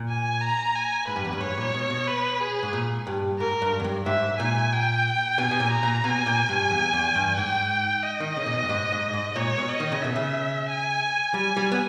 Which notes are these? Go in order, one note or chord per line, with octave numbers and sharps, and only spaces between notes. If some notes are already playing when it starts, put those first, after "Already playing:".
Already playing: A#2
G#5
A#5
G#5
G#2 B4
G2
E2
G2
G#2 C#5
A#2
B2
B2
B4
G#4
G#2
A#2
G2
G#2 A#4
G2
E2
G2
G#2 E5
A#2 G#5
G5
B2 G#5
B2
A#2
A#5
A#2
B2 G#5
A#2
G2
E2
E2
G2
G#2 G5
D#5
D#3
C#3
A#2
B2
G2
G#2
G#2
G#2
A#2 C#5
B2
D#5
D#3
C#3
B2 E5
C#3
G#5
G3 G#5
G3
B3